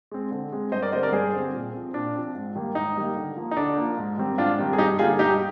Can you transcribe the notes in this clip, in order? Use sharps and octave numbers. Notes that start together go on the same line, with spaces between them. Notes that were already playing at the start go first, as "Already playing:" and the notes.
G#3 C4
D3
G#3 C4
G2 C5 D#5
A#4 D5
D3 G3 C4 C5 D#5
A#4 D5
G2 G#4 C5
D3 G3 C4
A#2
F3 C4
A#2 D4
F3 C4
G#2
D#3 G3 A#3
G#2 D#4
D#3 G3 A#3
D3
F3 A#3
D#4
D3 D4
F3 A#3
G#2
D#3 G3 C4
G#2 D4 F4
D#3 G3 C4
G#4
G2 D#4 G4
D3 G3 A#3 F4 G#4
G2 D#4 G4